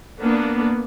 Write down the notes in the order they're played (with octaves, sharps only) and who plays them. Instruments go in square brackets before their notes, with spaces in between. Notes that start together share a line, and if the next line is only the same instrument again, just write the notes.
[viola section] A#3 B3 D4